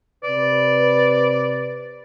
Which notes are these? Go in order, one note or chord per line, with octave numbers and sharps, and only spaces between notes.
C3 B4 D5